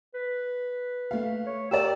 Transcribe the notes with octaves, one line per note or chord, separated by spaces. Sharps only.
B4
A3 F5
C#5
G4 A#4 D5 E6